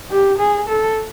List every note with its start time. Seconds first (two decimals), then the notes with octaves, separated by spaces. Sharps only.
0.11 G4
0.38 G#4
0.68 A4